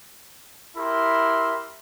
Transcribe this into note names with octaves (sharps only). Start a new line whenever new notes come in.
E4 G4 A#4 E5 B5 C6